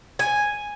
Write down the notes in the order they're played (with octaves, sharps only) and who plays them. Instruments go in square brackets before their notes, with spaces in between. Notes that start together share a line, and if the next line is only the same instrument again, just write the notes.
[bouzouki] G#5